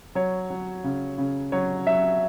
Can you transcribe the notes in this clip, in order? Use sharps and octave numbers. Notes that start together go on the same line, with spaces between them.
F#3 C#5
F#3
C#3
C#3
F#3 C#5
F#3 E5